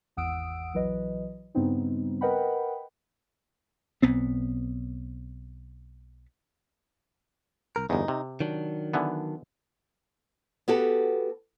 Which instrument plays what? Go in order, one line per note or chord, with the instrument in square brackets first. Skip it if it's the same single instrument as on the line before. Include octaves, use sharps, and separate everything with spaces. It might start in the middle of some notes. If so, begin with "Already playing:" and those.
[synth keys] G#1 E2 F#5 D#6 E6 D7
A#1 E3 F#3 B4 D#5
G2 C#3 G3 B3 C4 D#4
A#4 B4 D#5 F#5 G5 B5
[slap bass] B1 B3 C4
[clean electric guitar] C2 A#4
[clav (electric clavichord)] G1 E2 [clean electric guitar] D#4
[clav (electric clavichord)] C3
[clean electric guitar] D#3 F#3 D4
[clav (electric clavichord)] D3 E3 B3
[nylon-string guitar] B3 F#4 G4 A4